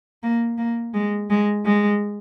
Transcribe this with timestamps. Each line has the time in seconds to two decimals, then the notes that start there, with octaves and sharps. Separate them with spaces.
0.23 A#3
0.58 A#3
0.94 G#3
1.30 G#3
1.65 G#3